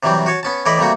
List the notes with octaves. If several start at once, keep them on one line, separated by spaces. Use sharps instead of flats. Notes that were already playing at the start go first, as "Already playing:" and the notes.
C3 E3 F#3 G3 C4
F#4 C#5 A5
B3 C#4 A5
A2 E3 E4 D5 D#5 B5
C3 G3 A3 A#3 F#4